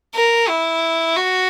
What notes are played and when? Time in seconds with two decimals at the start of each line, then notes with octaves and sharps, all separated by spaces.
0.15 A#4
0.49 E4
1.16 F#4